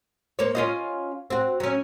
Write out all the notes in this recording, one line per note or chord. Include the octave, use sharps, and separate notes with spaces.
A#3 C5 C#5
C#4 F4 D#5
C4 F#4
F#3 C#4